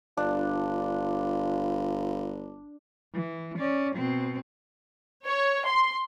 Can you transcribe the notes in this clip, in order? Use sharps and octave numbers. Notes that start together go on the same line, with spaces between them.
G1 D4 F4
E3
C#4 D5
B2 C4
C#5
C6